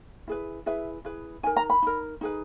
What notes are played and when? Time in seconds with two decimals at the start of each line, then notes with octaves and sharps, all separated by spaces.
0.28 E4 G#4 B4
0.66 E4 G#4 B4 E5
1.05 E4 G#4 B4
1.43 D#4 A#4 G#5
1.57 A#5
1.70 B5
1.82 D#4 A#4
2.21 D#4 G#4 B4